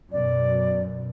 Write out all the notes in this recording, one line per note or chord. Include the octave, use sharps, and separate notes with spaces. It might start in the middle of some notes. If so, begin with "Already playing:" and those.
F#2 B2 D5